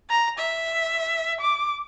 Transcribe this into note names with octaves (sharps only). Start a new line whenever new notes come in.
A#5
E5
D6